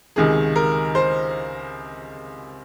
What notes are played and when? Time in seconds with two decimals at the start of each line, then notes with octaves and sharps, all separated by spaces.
0.16 C#2 C3 D#3 G#3 G#4
0.56 A#4
0.95 C5